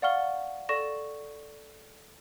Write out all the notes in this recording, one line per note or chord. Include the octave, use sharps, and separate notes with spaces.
D5 F5 F#5 C#6 F6 G7
A4 D5 C#6 A#6 E7